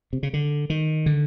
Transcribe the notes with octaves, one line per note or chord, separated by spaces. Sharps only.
C3
C#3
D3
D#3
D3